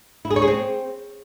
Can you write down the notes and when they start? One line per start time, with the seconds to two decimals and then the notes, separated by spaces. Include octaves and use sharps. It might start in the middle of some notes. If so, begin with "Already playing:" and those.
0.25 E4
0.30 G#4
0.36 C#5
0.42 G#4
0.48 C4